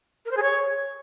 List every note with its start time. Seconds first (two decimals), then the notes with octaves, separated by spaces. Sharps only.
0.25 A#4
0.31 C5
0.36 G#4
0.42 C#5